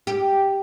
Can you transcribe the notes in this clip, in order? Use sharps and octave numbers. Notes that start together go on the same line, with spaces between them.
G4